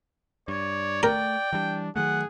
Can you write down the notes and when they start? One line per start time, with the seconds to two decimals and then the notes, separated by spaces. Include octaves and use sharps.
0.48 G2 C#5 D5
1.03 A3 A#4 G5
1.53 E3 G3 D4
1.96 D#3 F#3 A3 G#4 F#5